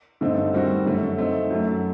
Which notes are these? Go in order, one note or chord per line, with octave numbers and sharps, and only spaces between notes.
G2 D3 A3 C4 D#4
D#3 G3 C4 F#4
F#2 D3 A3
A3 C4 D#4
F#2 F#3 A3